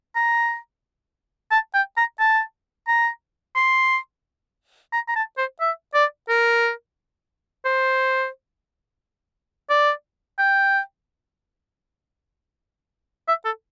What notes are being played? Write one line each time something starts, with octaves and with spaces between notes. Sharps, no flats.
A#5
A5
G5
A#5
A5
A#5
C6
A#5
A#5
A5
C5
E5
D5
A#4
C5
D5
G5
E5
A4